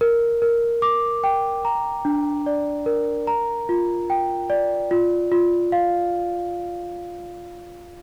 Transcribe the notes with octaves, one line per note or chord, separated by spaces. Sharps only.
A#4
A#4
D6
G5
A#5
D4
D5
A#4
A#5
F4
G5
D5
F4
F4
F5